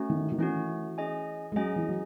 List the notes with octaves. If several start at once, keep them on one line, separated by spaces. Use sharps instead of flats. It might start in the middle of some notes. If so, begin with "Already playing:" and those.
Already playing: A3 C#4 F#4
D#3
D#3
E3 A3 C#4 F#4
C#4 G#4 D#5 G#5
G#3
F#3 C#4 G#4 D#5 G#5
E3
F#3